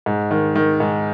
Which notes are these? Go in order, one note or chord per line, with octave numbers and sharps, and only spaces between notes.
G#2
D#3
D#3
G#2